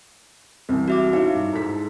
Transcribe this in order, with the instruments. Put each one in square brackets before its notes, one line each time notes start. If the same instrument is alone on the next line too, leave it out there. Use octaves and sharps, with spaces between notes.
[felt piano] C2 C3 E3
[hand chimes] F#4 E5 D6
[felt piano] C#4 F#4 F5 [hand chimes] D#4 E4
[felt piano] G2
G#2 A4 B6